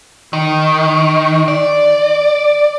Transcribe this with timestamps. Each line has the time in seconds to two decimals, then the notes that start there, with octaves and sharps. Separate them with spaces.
0.33 D#3
1.48 D5